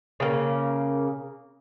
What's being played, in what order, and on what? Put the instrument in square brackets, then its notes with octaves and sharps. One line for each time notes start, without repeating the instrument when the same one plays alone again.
[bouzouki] C#3 A#3